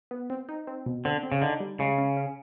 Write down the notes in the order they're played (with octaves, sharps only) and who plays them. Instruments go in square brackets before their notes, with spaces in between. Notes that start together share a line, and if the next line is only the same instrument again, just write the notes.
[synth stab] B3
C4
D#4
C4
B2
[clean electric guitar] D3 [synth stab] C4
[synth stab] C4
[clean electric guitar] C#3
[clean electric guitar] D3 [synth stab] D#4
[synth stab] G3
[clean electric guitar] C#3 [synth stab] G#3
[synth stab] C#4
C#4